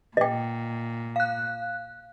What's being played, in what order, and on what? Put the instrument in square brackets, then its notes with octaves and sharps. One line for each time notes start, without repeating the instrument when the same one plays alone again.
[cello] A#2 [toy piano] D#5 G5
[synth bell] F5 F#6